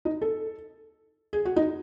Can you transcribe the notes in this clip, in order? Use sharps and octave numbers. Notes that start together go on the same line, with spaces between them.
D#4
A4
G#4
F#4
D#4